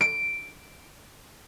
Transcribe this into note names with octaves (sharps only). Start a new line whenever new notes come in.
D7